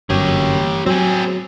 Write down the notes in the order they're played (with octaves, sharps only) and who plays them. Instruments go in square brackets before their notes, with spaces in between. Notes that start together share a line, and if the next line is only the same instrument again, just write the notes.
[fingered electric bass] G1 F#2 [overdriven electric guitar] G4 C#5
[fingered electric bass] F#3 [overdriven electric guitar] C4 G#4